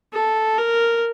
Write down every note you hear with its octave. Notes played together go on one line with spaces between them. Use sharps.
A4
A#4